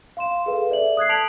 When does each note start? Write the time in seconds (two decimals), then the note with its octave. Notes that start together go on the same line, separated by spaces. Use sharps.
0.17 F5 C6 E7
0.46 G#4 A4 B4 F5
0.70 A4 D5 E5 F#7
0.97 D#6 F#6 G#6 C7
1.09 A5 B6 D7 F7 F#7